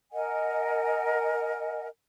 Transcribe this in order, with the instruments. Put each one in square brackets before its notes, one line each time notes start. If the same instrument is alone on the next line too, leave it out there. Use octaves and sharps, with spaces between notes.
[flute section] A#4 D#5 F#5 G#5